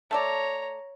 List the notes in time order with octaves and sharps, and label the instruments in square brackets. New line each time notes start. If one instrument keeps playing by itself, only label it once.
[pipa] A3 A4 D5 [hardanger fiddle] C#5 A#5